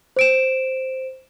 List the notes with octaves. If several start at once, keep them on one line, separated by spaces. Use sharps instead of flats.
C5 D7 E7